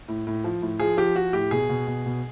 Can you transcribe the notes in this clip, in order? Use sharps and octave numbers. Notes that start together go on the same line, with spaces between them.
A2
A2
F3
A2
F3 G#4
F3 G4
F3 F#4
A2 G4
B2 G#4
B2
B2
B2